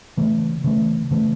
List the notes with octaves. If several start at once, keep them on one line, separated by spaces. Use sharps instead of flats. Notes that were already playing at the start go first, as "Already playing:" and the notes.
C#3 E3 A3
C#3 E3 A3
C#3 E3 A3